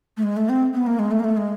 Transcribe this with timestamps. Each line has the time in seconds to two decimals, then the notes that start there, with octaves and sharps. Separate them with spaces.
0.17 A3
0.23 G#3
0.37 A3
0.49 C4
0.74 B3
0.87 A#3
0.99 G#3
1.11 A3
1.20 A#3
1.24 A3
1.37 G#3